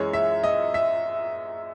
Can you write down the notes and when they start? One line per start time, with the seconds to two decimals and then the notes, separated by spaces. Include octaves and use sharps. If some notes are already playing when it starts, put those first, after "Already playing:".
Already playing: F#2 E3 G#3 C#5
0.13 E5
0.44 D#5
0.74 E5